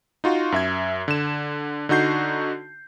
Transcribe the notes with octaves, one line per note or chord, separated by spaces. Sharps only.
D#4 F4 F#4
F#2 E5 G#6
D3 E7
D3 D#4 F#4 G6 C7